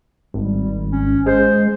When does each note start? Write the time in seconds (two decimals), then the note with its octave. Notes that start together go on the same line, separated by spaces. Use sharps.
0.34 G#1 G3
0.92 C#4
1.26 G#3 C5